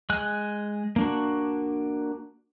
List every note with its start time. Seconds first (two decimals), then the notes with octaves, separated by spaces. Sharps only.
0.10 G#3 G#5 F#6
0.96 A#3 D4 F#4